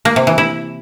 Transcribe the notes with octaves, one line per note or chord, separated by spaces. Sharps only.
A#3
C3
E3
E4